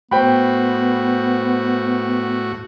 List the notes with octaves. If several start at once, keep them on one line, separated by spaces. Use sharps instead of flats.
A2 B3 F#4 C5 G5 B5